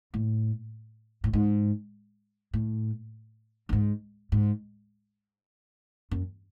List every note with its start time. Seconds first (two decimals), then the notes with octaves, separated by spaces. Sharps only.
0.14 A2
1.24 A2
1.33 G#2
2.53 A2
3.69 G2
3.73 G#2
4.32 G#2
6.11 F#2